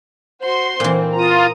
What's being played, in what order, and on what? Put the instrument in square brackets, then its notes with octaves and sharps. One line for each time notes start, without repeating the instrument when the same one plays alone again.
[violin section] F#4 C5 C6
[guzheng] A#2 E3 [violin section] C4
[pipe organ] F4 [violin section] A#5 D#6